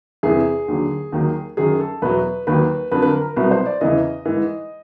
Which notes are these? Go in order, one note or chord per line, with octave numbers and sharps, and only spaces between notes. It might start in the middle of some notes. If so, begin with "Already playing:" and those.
E2 C3 E3 G#4
D#2 D3 F#3
D#2 D#3 F#3
F#2 D#3 F#3 G#4
A4
E2 B2 F#3 B4
D#2 D#3 F#3 B4
F2 D3 F#3 B4
B4
A#4
A#4
C2 B2 F#3 B4
C5
D5
E2 C#3 E3 D#5
G#2 E3